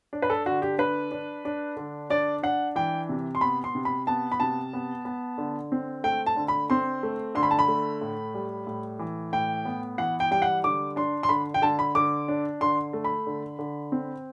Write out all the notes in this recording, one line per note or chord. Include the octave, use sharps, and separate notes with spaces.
D4
B4
A4
D3 F#4
G4
D4 B4
D4
D4
D3
D4 D5
D4 F#5
E3 G5
C3
C6
B3 B5
C6
C3
B5
B3 A5
B5
C3 A5
B3
B3
D3
C4
A3 G5
A5
D3
B5
C4 C6
A3
D3 C6
B5
A5
B5
A3
A2
G3
A2
E3
A2 G5
B3
E3 F#5
G5
G3 G5
F#5
D3 D6
D4 C6
C6
D3 B5
G5
D3 A5
B5
D3 D6
D4
D3 C6
A3
B5
D3
D3
C4